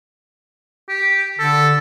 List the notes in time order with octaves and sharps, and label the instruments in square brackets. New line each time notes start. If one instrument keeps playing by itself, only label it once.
[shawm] G4
[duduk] D3 [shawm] A4